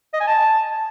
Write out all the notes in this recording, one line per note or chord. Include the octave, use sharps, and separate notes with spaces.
D#5
G#5
A5